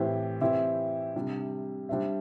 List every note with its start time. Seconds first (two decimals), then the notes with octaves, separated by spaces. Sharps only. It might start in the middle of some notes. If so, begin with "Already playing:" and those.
Already playing: A2 E3 C4 G4 C5
0.41 E3 C4 E4 G4
1.15 C3 G3 D4 G4
1.89 G3 D4 C5 E5